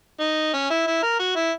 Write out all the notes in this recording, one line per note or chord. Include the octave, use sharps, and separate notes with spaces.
D#4
C#4
E4
E4
A#4
F#4
E4